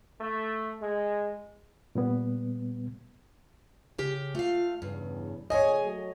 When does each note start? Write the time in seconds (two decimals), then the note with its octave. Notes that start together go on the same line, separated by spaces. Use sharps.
0.20 A3
0.81 G#3
1.95 A#2 G3 B3
3.98 C#3 G4
4.35 A3 F4 F5
4.82 E2 G2 C#3
5.50 A#2 D3 G#4 C#5 D#5 G#5
5.82 F#3 A3